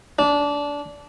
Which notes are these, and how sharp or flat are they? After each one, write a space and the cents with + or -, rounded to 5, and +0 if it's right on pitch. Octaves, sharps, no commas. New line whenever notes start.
D4 -20